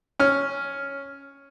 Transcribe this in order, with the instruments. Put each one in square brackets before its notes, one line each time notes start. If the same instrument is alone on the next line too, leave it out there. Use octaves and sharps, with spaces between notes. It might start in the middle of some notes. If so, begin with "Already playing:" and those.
[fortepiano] C#4 F6